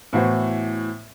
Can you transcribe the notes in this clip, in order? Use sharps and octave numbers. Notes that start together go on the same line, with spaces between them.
A2 E3 B3 F#4 C5